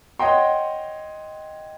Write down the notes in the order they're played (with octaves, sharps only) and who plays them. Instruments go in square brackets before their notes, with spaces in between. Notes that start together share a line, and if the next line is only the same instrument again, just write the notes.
[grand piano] C#5 D#5 F#5 G5 C6